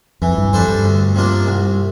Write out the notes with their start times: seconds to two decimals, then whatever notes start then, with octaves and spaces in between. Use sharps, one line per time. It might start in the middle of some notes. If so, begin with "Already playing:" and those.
0.22 F2 E3
0.38 G2
0.53 F2 G3 D4 A4 C5
0.68 G2
0.84 D2
1.15 C3 F3 A#3 D4
1.47 C2